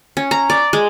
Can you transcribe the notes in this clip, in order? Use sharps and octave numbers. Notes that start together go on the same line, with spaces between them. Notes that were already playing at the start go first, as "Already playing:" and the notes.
C#4
A#5
D5
G#3